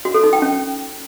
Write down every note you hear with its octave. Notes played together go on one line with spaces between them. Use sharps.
F#4
A4
D#4
G5
C#4